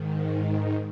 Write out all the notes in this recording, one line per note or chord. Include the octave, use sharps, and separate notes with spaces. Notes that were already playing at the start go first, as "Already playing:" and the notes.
Already playing: G#2 D#3